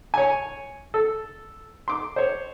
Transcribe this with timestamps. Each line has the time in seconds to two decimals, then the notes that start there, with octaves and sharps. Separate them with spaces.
0.14 C#5 G#5
0.94 A4
1.88 C6 D6
2.16 C5 C#5